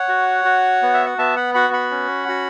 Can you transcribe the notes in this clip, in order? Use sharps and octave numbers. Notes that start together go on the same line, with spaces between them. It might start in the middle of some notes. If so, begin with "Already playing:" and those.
Already playing: C#5 F#5
F#4
F#4
B3
E5
F#5
B3 E5 A5
F#5 B5
F#4 F#5 B5
F#5 B5
C#4
F#4